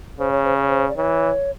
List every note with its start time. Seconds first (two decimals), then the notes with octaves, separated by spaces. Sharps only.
0.19 C#3 C5
0.32 C#5
0.44 C5
0.57 C#5
0.69 C5
0.89 D5
0.97 E3 C#5